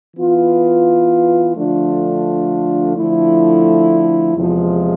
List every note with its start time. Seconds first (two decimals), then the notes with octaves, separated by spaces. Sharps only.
0.16 E3 B3 F4
1.55 D3 F3 A3 D4 F4
2.95 D3 F3 A3 E4
4.34 E2 C3 F3 G#3